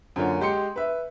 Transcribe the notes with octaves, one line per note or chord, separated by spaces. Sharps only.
F#2 D3 A#3 F4 C#5
G#3 G4 C6 C#7
B4 E5